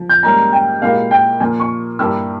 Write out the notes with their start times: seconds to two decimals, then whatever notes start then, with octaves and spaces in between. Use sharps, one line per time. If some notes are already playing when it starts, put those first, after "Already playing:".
Already playing: F3
0.09 G6
0.23 G#2 G3 A#3 C#4 A#5
0.53 G5
0.82 A#2 G#3 E4 G4 A#4 F5
1.11 G5
1.40 A#2 F3 A#3 G#5
1.60 C#6
1.99 G2 G3 A#3 E4 G4 E6